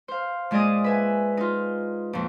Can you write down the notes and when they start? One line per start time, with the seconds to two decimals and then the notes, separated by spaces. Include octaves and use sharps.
0.08 C5 F5
0.51 A#2 G#3 G#4 D5 D#5 D#6
0.84 B4 E5 G#5
1.37 D#4 F4
2.13 F2 A#2